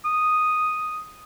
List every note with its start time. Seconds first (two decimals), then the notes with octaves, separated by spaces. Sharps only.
0.05 D#6